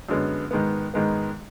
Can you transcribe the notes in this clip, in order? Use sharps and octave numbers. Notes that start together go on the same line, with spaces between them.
F#2 D3 G#3 B3
G#2 D#3 G#3 B3
G#2 D#3 G#3 B3